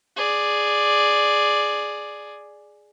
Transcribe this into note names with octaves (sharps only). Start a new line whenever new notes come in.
G#4 D5